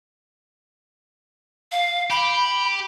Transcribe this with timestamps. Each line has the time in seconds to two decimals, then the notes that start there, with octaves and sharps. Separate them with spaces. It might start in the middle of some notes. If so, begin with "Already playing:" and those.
1.72 F5
2.10 G4 B5